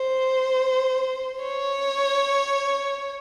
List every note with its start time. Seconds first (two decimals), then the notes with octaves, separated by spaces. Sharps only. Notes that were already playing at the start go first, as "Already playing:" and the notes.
Already playing: C5
1.43 C#5